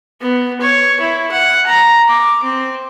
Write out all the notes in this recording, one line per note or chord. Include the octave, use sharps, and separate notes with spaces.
B3
C#5
E4
F#5
A#5
D6
C4